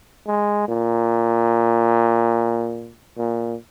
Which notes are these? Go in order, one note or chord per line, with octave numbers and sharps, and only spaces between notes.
G#3
A#2
A#2